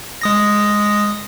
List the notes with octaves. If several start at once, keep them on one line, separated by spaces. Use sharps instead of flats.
G#3 D#6 A#6